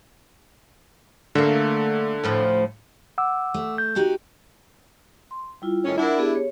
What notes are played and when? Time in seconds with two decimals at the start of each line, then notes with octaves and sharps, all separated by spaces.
1.35 D3 A3 A#3
2.24 D2 A2 F3
3.18 F#5 D6 E6
3.54 A3
3.78 G6
3.96 D#4 F#4 G4
5.31 C6
5.62 G3 E4 F4
5.85 A2 D#3 C#4
5.98 D4 E4 A#4 F#5
6.18 B3 G4 G#4
6.35 C#5